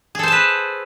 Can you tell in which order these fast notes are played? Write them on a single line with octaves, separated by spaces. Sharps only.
G#4 A4 C5 A5 B4